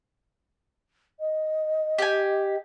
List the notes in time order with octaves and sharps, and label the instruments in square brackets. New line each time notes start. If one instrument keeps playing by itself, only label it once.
[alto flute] D#5
[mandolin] G4 G#5